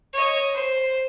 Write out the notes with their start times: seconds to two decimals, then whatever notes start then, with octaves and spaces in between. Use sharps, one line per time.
0.13 C#5 D#5
0.53 C5